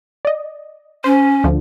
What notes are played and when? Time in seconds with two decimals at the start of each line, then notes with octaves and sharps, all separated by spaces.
0.25 D5 D#5
1.04 C#4 C5
1.44 D2 D3 F3